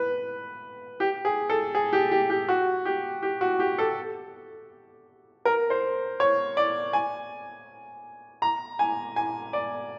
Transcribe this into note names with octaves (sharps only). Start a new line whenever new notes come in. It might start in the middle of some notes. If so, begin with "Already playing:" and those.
Already playing: B4
G4
G#4
A4
G#4
G4
G4
G4
F#4
G4
G4
F#4
G4
A4
A#4
C5
C#5
D5
G#5
A#5
G#5
G#5
D5